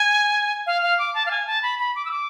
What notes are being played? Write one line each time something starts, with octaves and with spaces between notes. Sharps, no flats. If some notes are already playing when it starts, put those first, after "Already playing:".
Already playing: G#5
F5
F5
D6
A5
F5
G#5
A5
B5
B5
D6
E6
D6